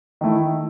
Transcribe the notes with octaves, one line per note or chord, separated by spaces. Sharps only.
D#3 A3 E4